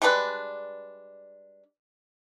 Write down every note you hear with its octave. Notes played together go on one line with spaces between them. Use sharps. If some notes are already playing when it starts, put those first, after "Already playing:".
G3 G#3 D4 B4